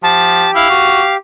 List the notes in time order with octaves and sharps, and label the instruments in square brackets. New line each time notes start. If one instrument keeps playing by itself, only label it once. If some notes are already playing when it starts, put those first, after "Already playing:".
[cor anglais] F3 [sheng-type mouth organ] G4 [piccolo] A5
[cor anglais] E4 [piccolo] F5
[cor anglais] F#4